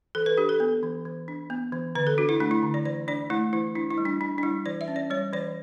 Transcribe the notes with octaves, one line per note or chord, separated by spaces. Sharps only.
E3 A4
B4
D4 G4
A4
B3
E3
E3
D4
B3
E3
D3 B4
A4
D4 F#4
E4
A3 D4
E4
D3
D5
E3 D5
D4 D5
A3 E4
E3 E4
D4 E4
E4
G3
D4
D4
D4
G3 E4
E3 D5
E5
C#4
D5
G3 C#5
E3 D5